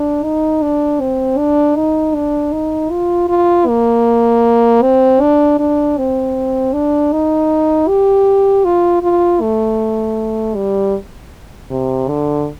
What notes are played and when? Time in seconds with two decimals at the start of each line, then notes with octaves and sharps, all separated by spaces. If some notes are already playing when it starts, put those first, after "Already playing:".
Already playing: D4
0.23 D#4
0.62 D4
1.00 C4
1.38 D4
1.76 D#4
2.15 D4
2.52 D#4
2.91 F4
3.29 F4
3.67 A#3
4.82 C4
5.21 D4
5.59 D4
5.98 C4
6.73 D4
7.12 D#4
7.88 G4
8.65 F4
9.03 F4
9.41 A3
10.55 G3
11.71 C3
12.08 D3